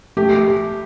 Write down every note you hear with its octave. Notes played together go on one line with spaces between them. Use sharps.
A3 G4